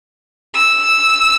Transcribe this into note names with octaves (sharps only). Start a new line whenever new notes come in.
E6